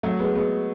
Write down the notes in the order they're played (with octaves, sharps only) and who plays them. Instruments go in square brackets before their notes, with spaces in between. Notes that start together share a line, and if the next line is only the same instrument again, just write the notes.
[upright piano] F#3 A3
G#3 B3
G#3 B3